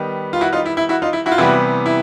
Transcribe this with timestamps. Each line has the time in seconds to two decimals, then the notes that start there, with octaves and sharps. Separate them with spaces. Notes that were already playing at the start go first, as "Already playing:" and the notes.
Already playing: D#3 G3 B3
0.33 F4
0.41 E4 F#4
0.53 D#4 F4
0.66 E4
0.77 E4
0.89 E4 F#4
1.02 D#4 F4
1.13 E4
1.26 E4 F#4
1.32 F4
1.38 C3 E3 G3 B3 E4 F#4
1.86 E4